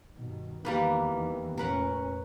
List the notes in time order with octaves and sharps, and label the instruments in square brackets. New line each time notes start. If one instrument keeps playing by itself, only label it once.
[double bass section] G2 B2 D#3
[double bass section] E2 D#3 E3 [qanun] G3 A#3 B4
[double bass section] F1 A#2 C#4 [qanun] A#4 B4 F#5